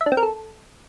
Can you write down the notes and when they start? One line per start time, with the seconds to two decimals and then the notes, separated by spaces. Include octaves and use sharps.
0.01 E5
0.06 D4
0.12 C4
0.17 A#4
0.23 A4